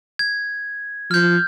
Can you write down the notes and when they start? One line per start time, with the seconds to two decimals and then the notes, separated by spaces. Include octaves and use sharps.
0.19 G#6
1.11 F3 F6 G6